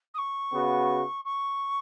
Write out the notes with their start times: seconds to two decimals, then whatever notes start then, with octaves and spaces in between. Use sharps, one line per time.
0.14 D#6
0.18 C#6
0.51 C#3 B3 F#4
1.25 C#6